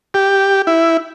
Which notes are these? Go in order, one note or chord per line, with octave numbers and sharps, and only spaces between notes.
G4
E4